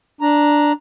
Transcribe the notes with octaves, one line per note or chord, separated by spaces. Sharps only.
D4 A#5